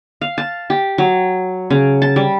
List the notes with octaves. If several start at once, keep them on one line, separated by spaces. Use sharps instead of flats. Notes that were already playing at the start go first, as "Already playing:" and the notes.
F5
A5
G4
F#3
C#3
A5
G3